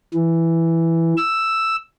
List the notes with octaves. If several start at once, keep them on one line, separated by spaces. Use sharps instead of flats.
E3
E6